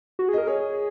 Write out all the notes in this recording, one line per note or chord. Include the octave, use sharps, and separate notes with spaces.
F#4
G#4
A#4 D#5
G#4 C#5